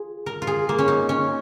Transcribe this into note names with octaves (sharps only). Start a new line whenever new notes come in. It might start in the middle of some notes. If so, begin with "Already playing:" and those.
Already playing: F4 G#4
A#4
F4
G#4
A#3
C#4
D#4
C#4